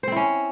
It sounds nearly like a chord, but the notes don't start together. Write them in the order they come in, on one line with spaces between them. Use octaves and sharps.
C5 C4 E4 C#4